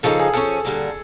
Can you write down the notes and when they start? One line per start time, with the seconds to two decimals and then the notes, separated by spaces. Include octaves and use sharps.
0.03 C#3 F3 A#3 D#4 A4
0.19 G#4
0.33 F3 A#3 C#4 A4
0.65 D3 G3 A#3